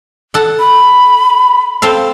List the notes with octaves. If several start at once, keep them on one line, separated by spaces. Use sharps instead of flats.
A4 F#5
B5
C4 A4 F5